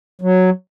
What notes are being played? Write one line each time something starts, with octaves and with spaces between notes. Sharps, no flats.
F#3